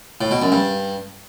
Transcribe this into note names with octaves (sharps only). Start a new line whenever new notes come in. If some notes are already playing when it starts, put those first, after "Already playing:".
A2
B2
F#2
G2